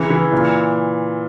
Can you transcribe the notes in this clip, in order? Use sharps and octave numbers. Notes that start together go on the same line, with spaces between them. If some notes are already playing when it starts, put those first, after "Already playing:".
Already playing: C#3 E3
E3
A#2